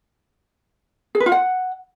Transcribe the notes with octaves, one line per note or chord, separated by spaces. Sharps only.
G#4
B4
F4
F#5